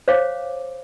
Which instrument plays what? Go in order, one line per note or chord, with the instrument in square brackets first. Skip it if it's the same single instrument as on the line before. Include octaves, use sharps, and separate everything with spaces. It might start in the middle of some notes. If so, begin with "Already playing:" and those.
[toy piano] C5 C#5 F5 D6